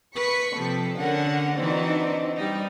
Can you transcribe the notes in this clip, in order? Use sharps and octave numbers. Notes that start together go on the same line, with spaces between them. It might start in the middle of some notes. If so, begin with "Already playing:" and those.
B4 C#6 B6 C#7
C3 F3 A4
D3 C#4 A#4 F#5
E3 C4 D4 D#4 F#4 D5
G3 D#4